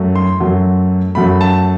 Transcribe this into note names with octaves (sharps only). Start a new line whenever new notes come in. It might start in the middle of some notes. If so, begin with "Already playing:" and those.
Already playing: F#2 F#3 A3
C6
F#2 F#3 A3
F#2 F#3 A3 B5
A5